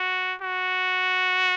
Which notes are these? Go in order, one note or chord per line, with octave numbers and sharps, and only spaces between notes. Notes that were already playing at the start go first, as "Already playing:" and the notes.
Already playing: F#4
F#4